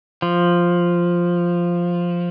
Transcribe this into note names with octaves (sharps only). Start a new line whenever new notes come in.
F3